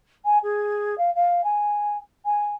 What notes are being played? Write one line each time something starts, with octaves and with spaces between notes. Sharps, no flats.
G#5
G#4
F5
F5
G#5
G#5